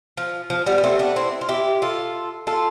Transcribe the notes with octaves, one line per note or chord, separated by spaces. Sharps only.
F3
F3
G3 B3
B3
A3 C4
B3 D4
C4 E4
F4
E4 G4
F4 A4
F4 A4